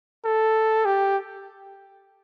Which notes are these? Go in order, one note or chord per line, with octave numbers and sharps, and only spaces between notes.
A4
G4